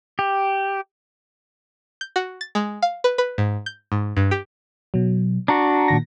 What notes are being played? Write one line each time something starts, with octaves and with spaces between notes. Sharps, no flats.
G4
G6
F#4
A6
G#3
F5
B4
B4
G#2
G6
G#2
G2
G4
B2 F#3
D4 F#4 A#5
A#2 D#3 A#6